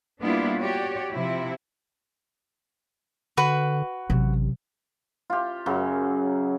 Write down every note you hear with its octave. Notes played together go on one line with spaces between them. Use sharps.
G3 A#3 B3 D4 E4 F4
F#4 G4 C#5 D5
C3 F3 E4
D3 F#4 B4
A1 C3 F#3
F4 G4
F#2 C#3 F#3